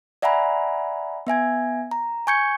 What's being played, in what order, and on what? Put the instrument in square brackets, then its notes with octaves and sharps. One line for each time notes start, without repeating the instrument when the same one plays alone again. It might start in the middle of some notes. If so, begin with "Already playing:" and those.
[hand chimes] D5 E5 F#5 G#5 A#5 B5
B3 E5 G#5 G#6
A#5
G#5 C#6 G6 G#6 C#7